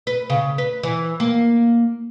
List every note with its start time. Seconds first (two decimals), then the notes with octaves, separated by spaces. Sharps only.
0.07 B4
0.30 C#3
0.58 B4
0.83 E3
1.20 A#3